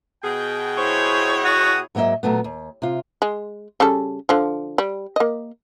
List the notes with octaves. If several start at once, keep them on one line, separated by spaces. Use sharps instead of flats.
B2 G#4 G5
E4 C5 C#5 C#6
F#4 F#5 D#6
G#2 F#3 A#3 D#5 E5
A#2 F#3 A3 B3
D#2
C3 F4
G#3
C#3 G3 A4
D3 F3
G3
A#3 D#5